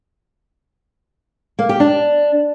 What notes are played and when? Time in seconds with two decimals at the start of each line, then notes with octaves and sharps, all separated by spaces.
1.59 A#3
1.69 G4
1.80 D4